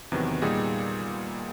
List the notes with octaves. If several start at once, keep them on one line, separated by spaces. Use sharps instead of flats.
E2 C3 D#3 F#3 B3
A#2 G3 B3 D#4 G#4